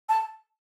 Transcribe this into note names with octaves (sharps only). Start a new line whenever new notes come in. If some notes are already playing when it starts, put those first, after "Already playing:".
A5